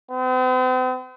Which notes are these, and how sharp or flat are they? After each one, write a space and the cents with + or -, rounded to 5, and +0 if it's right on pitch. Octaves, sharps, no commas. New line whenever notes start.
C4 -45